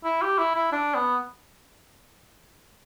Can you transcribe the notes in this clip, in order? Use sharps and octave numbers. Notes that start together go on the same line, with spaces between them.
E4
G4
E4
E4
D4
B3